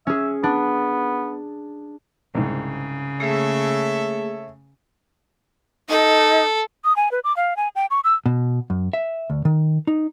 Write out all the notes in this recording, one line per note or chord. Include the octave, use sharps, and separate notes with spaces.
C#4 G#4 E5
B3 D4
C2 G#2 C#3
A3 A#3 G#4 A4 C#5 E5
D#4 A4
D#6
G#5
B4
D6
F5
G#5
G5
C#6
E6
B2
F#2
E5
D2
D#3
D#4